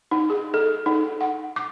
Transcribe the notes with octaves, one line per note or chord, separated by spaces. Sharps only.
D#4
G#4
A4
D#4
F#5
D6